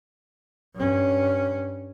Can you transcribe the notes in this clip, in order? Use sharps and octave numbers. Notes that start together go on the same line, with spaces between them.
G2 C#4